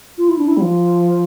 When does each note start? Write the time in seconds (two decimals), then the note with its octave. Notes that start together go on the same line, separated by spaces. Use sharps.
0.18 F4
0.29 E4
0.38 D4
0.48 E4
0.57 G3
0.61 F3